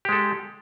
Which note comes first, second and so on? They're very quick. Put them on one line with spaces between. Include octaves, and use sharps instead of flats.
G4 G#3 A4